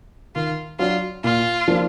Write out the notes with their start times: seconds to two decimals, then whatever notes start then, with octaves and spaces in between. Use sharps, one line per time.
0.35 D#3 F4
0.79 F#3 D4 F4
1.24 A#2 F4
1.68 F3 A#3 D4